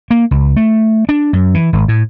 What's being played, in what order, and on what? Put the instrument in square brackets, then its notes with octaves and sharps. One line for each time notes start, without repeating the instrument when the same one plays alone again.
[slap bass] A#3
C#2
A3
D4
F#2
E3
G#1
A2